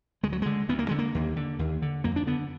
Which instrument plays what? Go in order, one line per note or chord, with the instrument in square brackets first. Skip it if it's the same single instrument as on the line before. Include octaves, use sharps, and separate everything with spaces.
[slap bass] D2 G#3
F#3
D3 G#3
D2 B3
A#3
D3 G#3
A#3
D#2
D3
D#2
D3
F2 A#3
D4
D3 B3